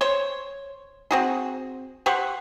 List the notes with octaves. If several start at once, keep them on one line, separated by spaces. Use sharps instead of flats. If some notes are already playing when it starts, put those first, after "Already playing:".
C5 C#5
C4 F#4 G#4
G4 C5 F#5 C#6